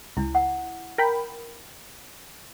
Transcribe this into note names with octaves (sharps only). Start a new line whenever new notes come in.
C#2 D4 E4
F#5
A#4 G5 B5